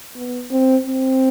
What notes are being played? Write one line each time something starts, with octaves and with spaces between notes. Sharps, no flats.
B3
C4
C4